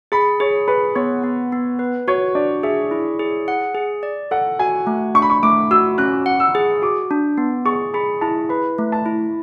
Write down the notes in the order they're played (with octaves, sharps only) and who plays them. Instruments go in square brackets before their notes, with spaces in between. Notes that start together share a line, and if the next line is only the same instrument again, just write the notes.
[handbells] G#4 [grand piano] B5
[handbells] G#4 [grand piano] C#5
[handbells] G#4 [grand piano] B4
[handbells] B3 [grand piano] C#5
[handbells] B3
B3
B4
[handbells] F#4 [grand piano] C#5
[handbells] D4 [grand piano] D5
[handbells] G#4 [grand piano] E5
[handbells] E4
G#4
F#5
G#4
D5
[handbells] A4 [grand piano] F#5
[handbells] F#4 [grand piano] G#5
[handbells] A3
[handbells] D4 [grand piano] C#6
[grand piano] B5
C#6
[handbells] A3 [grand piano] D6
[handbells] F#4 [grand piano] E6
[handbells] C#4 [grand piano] F#6
[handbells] F#5
[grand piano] E6
[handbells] G#4
[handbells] F#4 [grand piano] D6
[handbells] D4
B3
[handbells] G#4 [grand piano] C#6
[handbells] G#4 [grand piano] B5
[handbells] E4 [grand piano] A5
[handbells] B4 [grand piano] B5
[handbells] A3
[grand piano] A5
[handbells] E4